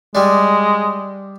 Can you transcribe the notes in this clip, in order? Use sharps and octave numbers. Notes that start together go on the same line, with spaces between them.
G3 G#3 D4